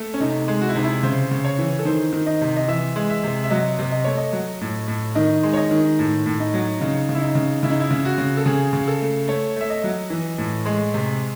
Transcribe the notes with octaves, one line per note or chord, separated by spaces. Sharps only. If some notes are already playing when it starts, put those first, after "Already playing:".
Already playing: A3
C#4
C3 D#4
G#3
F#4
E4
C3 D#4
E4
C#3 C5
C#3
C#5
E3
A4
D#3 C5
D#3
D#5
C3
D#5
E3 E5
G#3
E5
C3
E5
F#3 D#5
C3
D#5
A3 C#5
D#5
F#3
A2
A2
D#3 D#5
G#3
C#5
D#5
D#3
A2
A2
D#4
F#3
C#3 D#4
C#3
E4
D#4
C#3
C#3 E4
D#4
E4
C#3
F#4
C#3
A4
C#3 G#4
C#3
A4
A3
A3 C#5
A3 E5
D#5
F#3
E3
A2
G#3
C3